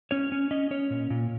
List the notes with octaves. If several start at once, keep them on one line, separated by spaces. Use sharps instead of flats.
C#4 C#5
C#4
C#4 D#5
C#4 C#5
A#2
A#2